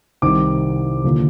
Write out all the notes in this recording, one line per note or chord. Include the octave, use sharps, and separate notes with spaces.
C2 C3 D#3 D6
D#2 D3 F3